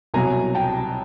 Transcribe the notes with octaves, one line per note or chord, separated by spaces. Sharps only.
C2 B2 F#3 G#5 A#5
G5 A5